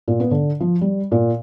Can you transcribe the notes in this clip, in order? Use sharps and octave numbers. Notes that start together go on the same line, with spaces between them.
A#2
B3
D3
F3
G3
A#2